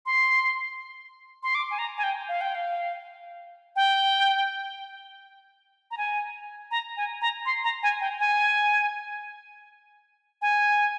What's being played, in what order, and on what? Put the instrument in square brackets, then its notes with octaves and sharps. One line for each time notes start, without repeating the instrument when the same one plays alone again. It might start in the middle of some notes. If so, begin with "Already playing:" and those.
[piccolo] C6
C6
D6
G#5
A#5
G#5
G5
F5
G5
F5
G5
A#5
G#5
A#5
G#5
A#5
C6
A#5
G#5
G5
G#5
G#5